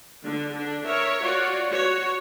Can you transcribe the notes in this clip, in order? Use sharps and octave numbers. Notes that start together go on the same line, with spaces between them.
D3
D3 D4
A#4 C#5 E5
F4 F#4 C#5 D5
F#4 C#5